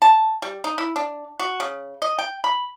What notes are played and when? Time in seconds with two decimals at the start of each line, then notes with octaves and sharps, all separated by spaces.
0.02 A5
0.42 G3
0.64 D#4
0.78 E4
0.96 D4
1.40 F#4
1.60 C#3
2.02 D#5
2.19 G5
2.44 B5